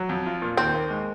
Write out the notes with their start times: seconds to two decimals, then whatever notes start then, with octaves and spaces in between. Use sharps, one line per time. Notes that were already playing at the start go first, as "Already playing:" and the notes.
Already playing: F#3
0.09 F2
0.26 F4
0.42 A#2
0.57 D#2 C4
0.74 A#3
0.90 G#3